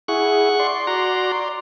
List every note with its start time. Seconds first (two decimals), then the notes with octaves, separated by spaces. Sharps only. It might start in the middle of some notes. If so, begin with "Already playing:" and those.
0.08 E4 G#4 F#5 C#6
0.60 D5 C6
0.87 F#4 A#5